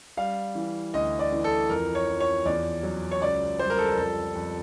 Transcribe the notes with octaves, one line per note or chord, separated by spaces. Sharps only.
G3 F5
E3
D2 D#5
D5
E3
A4
F2 A#4
C#5
F3
C#5
E2 D5
F#3
C#5
C#2 D5
G3 C5
A#4
A4
A#4
F2 A4
F2